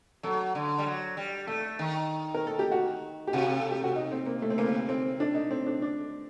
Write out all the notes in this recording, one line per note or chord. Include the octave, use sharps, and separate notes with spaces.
F#3 A4
D3
G3
F#3
G3
A3 A4
D#3
A#4
A4
G4
F#4
G4
C3 F#4
A4
G4
F#4
D#4
C4
A#3
A3
C4
C3 A#3
C4
D4
D#4
C4
D4
D4